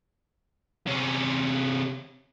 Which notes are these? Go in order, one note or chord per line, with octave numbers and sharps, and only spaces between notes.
C3 C#4